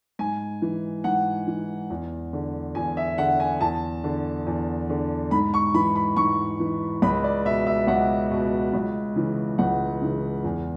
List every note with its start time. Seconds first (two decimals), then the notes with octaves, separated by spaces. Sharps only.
0.19 G#2 G#5
0.62 E3
1.04 G#2 F#5
1.47 E3
1.90 E2
2.33 D3
2.75 E2 G#5
2.97 E5
3.18 D3 F#5
3.40 G#5
3.61 E2 A5
4.04 D3
4.47 E2
4.90 D3
5.31 G#2 B5
5.54 C#6
5.74 E3 B5
5.96 B5
6.17 G#2 C#6
6.60 E3
7.02 C#2 B5
7.24 D5
7.45 B2 E5
7.67 E5
7.87 C#2 F#5
8.31 B2
8.74 C#2
9.16 C#3 E3
9.58 C#2 F#5
10.02 C#3 E3
10.44 E2